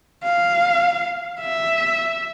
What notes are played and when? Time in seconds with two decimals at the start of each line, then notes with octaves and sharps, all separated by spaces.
0.24 F5
1.40 E5